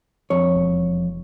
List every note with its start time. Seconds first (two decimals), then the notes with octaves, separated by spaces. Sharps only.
0.30 F2 C#5
0.55 E1